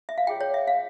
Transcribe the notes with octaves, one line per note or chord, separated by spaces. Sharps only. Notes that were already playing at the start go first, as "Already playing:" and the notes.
E5
F5
F4 G#4 C#5 G5
C#5
E5
F5